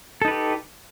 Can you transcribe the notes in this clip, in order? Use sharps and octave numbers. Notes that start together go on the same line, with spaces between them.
D#4 G4 A4 B4